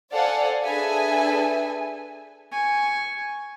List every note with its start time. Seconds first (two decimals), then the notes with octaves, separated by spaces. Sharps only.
0.13 A4 C5 D5 F5 F#5 G#5
0.65 D4 G#4 A4 B4 E5 G#5
2.52 G#5 C#6